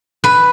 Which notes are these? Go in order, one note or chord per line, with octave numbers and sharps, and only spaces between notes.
B4